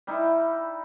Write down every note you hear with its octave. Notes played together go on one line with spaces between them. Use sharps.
G3 D#4 E4